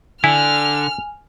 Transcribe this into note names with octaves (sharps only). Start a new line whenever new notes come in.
D3 E4 G#5 F6